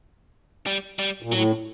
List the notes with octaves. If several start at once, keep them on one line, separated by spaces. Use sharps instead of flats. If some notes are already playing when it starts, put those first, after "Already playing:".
G3
G3
A#2
A2 F#3